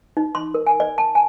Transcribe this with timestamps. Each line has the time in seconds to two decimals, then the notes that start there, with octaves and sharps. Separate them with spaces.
0.17 D#4
0.35 C6
0.54 A#4
0.67 G#5
0.80 D5
0.98 A5
1.15 G#5